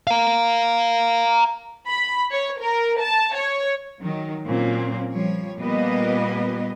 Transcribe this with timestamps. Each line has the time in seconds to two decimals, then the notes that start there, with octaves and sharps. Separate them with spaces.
0.07 F5 A#5
1.88 B5
2.32 C#5
2.61 A#4
3.01 A5
3.36 C#5
4.01 D#3 F#3
4.46 A#2 F#3 C4 C#4
5.12 F3 G3 C#5
5.57 A#2 G3 A#3 B3 B4 D#5